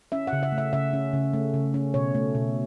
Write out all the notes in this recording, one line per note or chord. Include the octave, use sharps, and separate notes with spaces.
C#4 E5
F#5
C#3
E5
A3
E5
C#3 E5
C#4
C#3
A3
C#3
C#4
B2 C#5
A3
B2